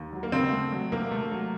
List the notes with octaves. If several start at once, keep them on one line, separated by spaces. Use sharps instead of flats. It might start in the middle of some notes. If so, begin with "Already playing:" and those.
Already playing: D#2
F#3
A#3
C#3 C4
A3
F#3
C3 A#3
A3
F#3